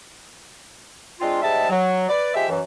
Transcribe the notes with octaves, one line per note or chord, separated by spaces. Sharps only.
G#3 C4 D4 F4
G#2 G3 G#3 E5 A5
F#3
B4 D5
F3 G#3 G4 E5
F#2 E3